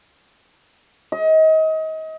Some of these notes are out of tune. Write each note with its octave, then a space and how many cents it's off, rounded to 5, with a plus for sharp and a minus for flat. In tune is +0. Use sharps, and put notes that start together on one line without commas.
D#5 +30